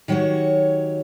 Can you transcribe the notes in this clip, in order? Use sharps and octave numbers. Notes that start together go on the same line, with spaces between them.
D#3 F#3 F#4 G4 C#5